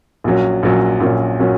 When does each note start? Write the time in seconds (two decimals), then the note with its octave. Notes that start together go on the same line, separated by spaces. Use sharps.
0.24 A#1 A#2 F#3 C#4
0.63 A#1 A#2 F#3 C#4
1.00 A#1 A#2 F#3 C#4
1.39 A#2 F#3 C#4